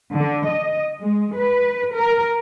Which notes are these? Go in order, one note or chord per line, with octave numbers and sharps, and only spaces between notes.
D3
D#5
G#3
B4
A#4